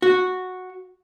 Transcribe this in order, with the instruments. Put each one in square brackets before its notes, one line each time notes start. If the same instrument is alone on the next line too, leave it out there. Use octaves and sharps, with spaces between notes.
[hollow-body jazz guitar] F#4